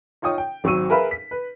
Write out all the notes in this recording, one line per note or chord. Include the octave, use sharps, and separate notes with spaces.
D#4 F4 C#5 G5 D#6
G5
G#1 F#3 C4 C#6 E6 D#7
G#4 A#4 B4 E5 F5 B5
B6
B4